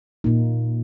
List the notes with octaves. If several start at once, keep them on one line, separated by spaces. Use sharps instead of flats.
A#2 A#3 D#4